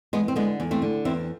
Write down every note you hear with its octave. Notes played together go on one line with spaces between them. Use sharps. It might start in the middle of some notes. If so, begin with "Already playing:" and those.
E2 G#3 B3
C4
D3 G#3 B3
E2
A3 C4
D3
E2 C4 E4